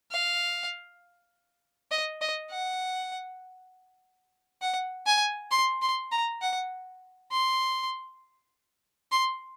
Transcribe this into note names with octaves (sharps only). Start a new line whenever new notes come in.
F5
D#5
D#5
F#5
F#5
G#5
C6
C6
A#5
F#5
C6
C6